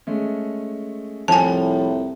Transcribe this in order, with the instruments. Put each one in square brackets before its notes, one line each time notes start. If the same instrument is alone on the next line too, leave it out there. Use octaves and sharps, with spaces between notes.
[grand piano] G#3 A3 C#4
[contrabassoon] C2 [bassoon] A2 [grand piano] F3 [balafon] G#5 A5